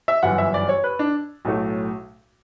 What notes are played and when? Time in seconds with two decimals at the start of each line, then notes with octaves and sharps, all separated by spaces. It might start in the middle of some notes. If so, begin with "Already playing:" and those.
0.08 E5
0.23 G1 F#2 E3 F#5
0.38 E5
0.54 D5
0.69 C#5
0.84 B4
0.99 D4
1.45 B1 A2 F#3 A3